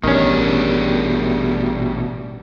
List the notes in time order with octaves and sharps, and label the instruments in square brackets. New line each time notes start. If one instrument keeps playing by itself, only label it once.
[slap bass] A1 [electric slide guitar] B2 D4 [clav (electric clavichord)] D#3 C#4 [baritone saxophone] G3